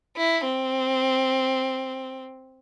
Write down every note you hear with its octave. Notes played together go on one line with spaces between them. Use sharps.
E4
C4